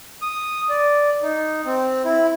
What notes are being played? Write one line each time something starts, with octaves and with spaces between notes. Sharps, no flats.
D#6
D5
D#4
C4
E4